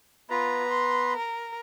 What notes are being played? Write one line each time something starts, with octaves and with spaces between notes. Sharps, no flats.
B3 F4 B4 A#5
C6
A#4